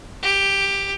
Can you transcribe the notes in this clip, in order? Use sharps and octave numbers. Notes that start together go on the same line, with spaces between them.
G4